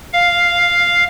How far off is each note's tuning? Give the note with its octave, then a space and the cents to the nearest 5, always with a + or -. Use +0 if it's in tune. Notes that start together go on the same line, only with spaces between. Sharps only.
F5 +0